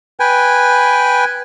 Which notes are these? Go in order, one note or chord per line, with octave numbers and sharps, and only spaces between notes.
B4 G5 G#5